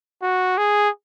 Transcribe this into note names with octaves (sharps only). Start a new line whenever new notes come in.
F#4
G#4